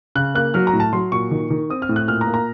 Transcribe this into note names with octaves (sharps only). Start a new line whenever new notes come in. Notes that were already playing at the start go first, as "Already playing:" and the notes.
C#3 F#6
A#3 F#6
F#3 F6
A#5
A2
A5
F#3 C6
A#2 C#6
D#3
D#3
C4 D#6
F6
A2
F#6
A#2 F6
A#5
A#3
A#5